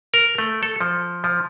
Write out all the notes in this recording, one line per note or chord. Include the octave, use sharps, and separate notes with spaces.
A#4
A3
A4
F3
F3